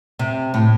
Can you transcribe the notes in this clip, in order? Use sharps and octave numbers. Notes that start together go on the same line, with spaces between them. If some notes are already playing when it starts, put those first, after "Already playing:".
C3
A2